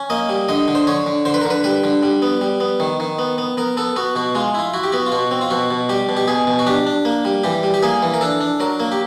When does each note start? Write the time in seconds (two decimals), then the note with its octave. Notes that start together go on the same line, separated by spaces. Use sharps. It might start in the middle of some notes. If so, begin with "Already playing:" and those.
Already playing: C#4
0.10 A#3 D#5
0.29 G3
0.49 D3 D#5
0.68 D3
0.75 C5
0.87 D3 C#5
1.06 D3
1.25 D3 C5
1.34 B4
1.42 A#4
1.45 D3
1.50 B4
1.64 G3 B4
1.84 D3
2.03 G3
2.22 B3
2.41 G3
2.60 B3
2.80 D#3
3.00 D#3
3.19 B3
3.38 B3
3.57 B3 A#4
3.77 B3 A4
3.96 B3 F#4
4.15 B2 F#4
4.35 G#3 F4
4.54 E4 F4
4.74 E4 F#4
4.84 G4
4.92 B3 F#4
5.06 F4
5.12 B2 F#4
5.31 C4
5.41 F4
5.50 B2 F#4
5.71 B2
5.89 G3 G4
6.09 B2
6.17 G4
6.28 B2 G#4
6.47 B2
6.59 F#4
6.67 D4 G4
6.87 D4
7.05 A#3
7.25 G3
7.44 E3 G4
7.63 G3
7.74 G4
7.83 A#3 G#4
8.02 E3
8.14 A#4
8.21 D4 A4
8.41 D4
8.60 F#3 A#4
8.80 A#3
8.92 G4